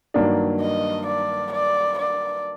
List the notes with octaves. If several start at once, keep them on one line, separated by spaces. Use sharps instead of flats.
G2 D#3 F#3 A#3 D4
D#5
D5
D5
D5